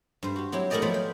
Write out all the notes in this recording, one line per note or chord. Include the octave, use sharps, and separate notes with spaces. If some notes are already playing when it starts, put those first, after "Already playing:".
G2 C5
F#4 G4
F#3 C4 E4 G4
A3 E4 A#4 D5 D#5 G5
F3 F#3 B3 F4 B5
G5